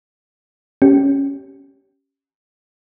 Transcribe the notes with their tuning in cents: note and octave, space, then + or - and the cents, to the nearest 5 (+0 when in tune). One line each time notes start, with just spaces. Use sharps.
C#4 +0 G4 -20